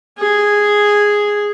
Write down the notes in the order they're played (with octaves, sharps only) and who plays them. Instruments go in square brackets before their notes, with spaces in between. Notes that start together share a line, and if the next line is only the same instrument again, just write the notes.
[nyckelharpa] G#4